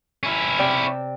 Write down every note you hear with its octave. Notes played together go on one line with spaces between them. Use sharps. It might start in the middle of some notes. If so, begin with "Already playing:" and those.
C#4 E4
C3 D5 G5